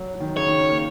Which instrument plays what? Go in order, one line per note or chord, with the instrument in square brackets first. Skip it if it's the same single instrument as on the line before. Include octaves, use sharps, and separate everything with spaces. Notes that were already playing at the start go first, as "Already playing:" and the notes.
Already playing: [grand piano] F#3
F#3
D#3
F#3
[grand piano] C#3 [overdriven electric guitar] C#5
[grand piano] D#3
C#4
A#3